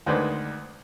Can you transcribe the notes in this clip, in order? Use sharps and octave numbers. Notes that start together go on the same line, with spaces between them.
D2 D#3 G#3 D4 B4 C5